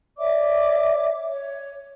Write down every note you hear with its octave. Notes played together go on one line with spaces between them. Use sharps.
C#5 D5 E5 D6
C#5